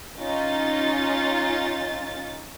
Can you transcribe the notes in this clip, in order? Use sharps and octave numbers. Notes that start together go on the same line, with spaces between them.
C#4 D#4 F4 A6